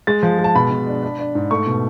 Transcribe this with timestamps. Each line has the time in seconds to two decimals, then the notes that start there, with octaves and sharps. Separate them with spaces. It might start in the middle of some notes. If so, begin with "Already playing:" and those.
0.07 G#3 A6
0.23 F3
0.39 G#3
0.44 A5
0.55 B2 B5
0.71 B2
0.87 D4
1.03 D4
1.19 D4
1.35 G#2
1.51 A3 C#6
1.67 B2